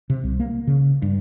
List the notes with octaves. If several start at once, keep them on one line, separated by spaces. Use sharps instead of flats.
C3
C2
A#3
C#3
G2